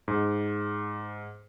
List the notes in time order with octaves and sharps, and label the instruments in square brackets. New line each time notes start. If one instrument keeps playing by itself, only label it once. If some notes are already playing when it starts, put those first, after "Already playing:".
[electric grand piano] G#2